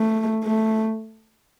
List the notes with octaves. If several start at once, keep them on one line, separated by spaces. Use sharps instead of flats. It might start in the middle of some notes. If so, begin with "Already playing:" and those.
Already playing: A3
A3